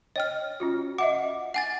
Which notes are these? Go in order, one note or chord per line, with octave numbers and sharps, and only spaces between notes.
C#5 D#5 G5 F6
C#4 F4 F#4
D#5 E5 F#5 D6
F#5 G#5 A6